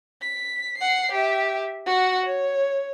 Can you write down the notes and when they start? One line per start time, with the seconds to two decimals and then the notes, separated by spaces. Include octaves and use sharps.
0.22 B6
0.77 F#5 C7
1.11 G4 E5
1.86 F#4 F#5
2.26 C#5